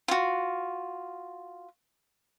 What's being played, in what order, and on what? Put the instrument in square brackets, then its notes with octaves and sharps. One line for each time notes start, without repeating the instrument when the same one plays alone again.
[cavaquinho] F4 F#4